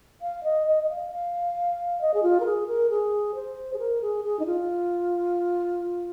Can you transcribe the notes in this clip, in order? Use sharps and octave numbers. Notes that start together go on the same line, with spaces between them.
F5
D#5
D#5
D#5
F5
F5
D#5
G#4
F4
A#4
G#4
A#4
G#4
C5
G#4
A#4
G#4
G#4
D#4
F4